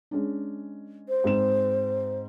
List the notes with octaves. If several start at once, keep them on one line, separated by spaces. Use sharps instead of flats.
G#3 C#4 D4
C5
G#2 C4 E7